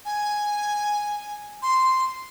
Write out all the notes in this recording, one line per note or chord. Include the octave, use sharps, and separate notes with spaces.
G#5
C6